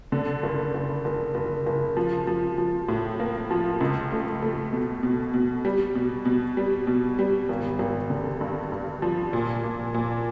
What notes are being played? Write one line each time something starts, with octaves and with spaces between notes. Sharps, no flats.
D3
F#1
F#1
F#1
F#1
F#1
F3
F3
F3
A2
A#3
F3
C#2
A3
A3
B2
B2
B2
G3
B2
B2
G3
B2
G3
G#1
G#1
D3
G2
G2
F3
A#2
A#2
A#2